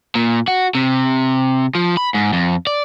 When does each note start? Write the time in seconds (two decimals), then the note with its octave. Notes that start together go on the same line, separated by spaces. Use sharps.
0.15 A#2
0.48 F#4
0.75 C3
1.75 F3
1.97 B5
2.14 G#2
2.33 F2
2.67 D5